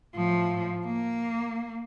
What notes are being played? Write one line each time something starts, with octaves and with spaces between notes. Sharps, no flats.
A2 F3
A#3